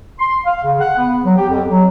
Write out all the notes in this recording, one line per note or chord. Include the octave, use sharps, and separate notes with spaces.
C6
F5
C#3
F#5
B3
F#3
G4
F2
F#3